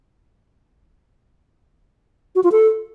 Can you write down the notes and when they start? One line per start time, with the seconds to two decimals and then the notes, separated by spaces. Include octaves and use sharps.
2.35 F#4
2.44 F4
2.52 A4